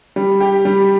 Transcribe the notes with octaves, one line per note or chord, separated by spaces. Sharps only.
G3
G4
G3